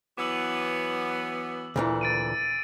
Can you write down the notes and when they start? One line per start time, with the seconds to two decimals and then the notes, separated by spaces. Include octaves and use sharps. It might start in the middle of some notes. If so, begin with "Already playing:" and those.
0.17 E3 F#3 B3 D6 E6 F#7
1.76 D2 A#2 E3
2.01 A6 D7 D#7